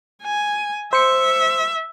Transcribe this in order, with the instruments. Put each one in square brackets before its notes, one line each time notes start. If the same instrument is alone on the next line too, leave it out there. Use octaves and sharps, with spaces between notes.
[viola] G#5
[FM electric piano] C5 C#7 [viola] E5